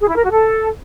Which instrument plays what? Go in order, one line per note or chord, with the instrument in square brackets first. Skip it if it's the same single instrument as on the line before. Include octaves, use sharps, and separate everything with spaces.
[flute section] G#4
E4
A#4
F#4
A4